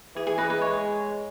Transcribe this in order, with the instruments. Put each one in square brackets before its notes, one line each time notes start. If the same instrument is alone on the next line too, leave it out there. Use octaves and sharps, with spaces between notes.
[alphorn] E3 [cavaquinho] G#4
[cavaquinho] G#4
B4 D#5
B4 D#5
[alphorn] G#3 [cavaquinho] C#5